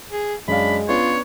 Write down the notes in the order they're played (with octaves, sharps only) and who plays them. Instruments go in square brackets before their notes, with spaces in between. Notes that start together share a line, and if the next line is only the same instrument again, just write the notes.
[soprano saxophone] G#4
[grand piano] F#2 F5 [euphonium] G#3 [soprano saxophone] D4 [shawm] B5
[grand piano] B3 C#4 D4 [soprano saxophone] F4 [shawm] C#5